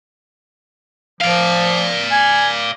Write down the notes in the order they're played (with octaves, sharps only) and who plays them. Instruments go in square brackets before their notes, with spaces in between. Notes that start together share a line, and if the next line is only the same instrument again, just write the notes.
[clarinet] F3 [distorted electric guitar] D5 F5
[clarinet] G#5